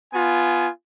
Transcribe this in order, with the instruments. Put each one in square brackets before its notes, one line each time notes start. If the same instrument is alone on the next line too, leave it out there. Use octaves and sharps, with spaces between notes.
[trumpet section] B3 F4 G#5